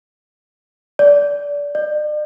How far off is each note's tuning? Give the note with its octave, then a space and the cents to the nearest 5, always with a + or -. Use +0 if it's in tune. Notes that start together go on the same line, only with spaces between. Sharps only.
D5 -25
D5 +40